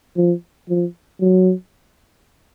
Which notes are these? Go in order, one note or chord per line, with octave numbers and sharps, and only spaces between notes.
F3
F3
F#3